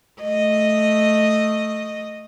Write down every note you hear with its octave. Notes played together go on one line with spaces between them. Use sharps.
A3 D#5